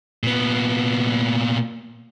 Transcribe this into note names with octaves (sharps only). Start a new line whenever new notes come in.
A#2 B3